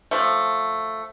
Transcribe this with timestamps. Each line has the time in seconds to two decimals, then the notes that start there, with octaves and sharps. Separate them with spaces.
0.11 F3 A3